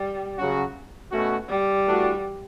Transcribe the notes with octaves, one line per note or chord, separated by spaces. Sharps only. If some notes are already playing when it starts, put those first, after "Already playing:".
Already playing: G3
C#3 F#3 C#4 F#4
B2 A3 C#4 F#4
G3
E3 A3 D4 F#4